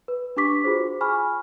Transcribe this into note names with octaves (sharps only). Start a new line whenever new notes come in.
B4
D4 G4 C#6 D6 B6
F4 F#4 G#4 C5
G#5 B5 C#6 F6